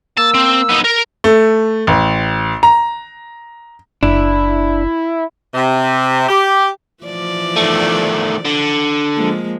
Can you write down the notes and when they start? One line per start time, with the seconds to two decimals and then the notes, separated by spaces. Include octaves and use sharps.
0.18 A#3 A5 E6
0.34 C4
0.69 B3 D#4
0.84 A#4
1.24 A3
1.87 A1
2.63 A#5
4.03 F#1 D4 E4
5.54 C3
6.29 G4
7.04 E3 F3 D5
7.56 D#3 A3
8.45 D3
9.16 F3 G#3 A#3